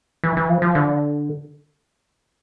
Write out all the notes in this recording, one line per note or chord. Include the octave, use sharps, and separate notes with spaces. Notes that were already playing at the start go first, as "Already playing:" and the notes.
E3
E3
F3
F3
D3